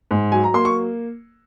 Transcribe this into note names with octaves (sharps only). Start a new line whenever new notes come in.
G#2
F#3 G#5
A#5
A#3 C6
C#6